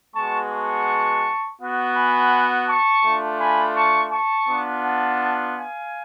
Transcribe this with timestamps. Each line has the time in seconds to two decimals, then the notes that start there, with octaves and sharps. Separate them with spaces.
0.14 G#3 B3 F#4 A5 C#6
0.51 A5 C#6
1.60 B3 F#4
1.95 G#5 B5
2.67 A5 C#6
3.04 A3 D4 F4
3.40 G#5 B5
3.76 A5 C#6
4.12 A5 C#6
4.48 B3 D4 F4
4.84 F#5 A5
5.56 F5 G#5